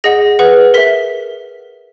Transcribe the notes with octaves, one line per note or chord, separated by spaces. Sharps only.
G#4 D#5 F#5 A#6
G#4 B4 F#5
A#4 E5 B6